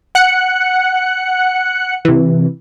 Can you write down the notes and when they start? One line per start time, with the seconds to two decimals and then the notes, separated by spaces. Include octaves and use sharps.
0.15 F#5 F#6 C#7
2.05 C3 E3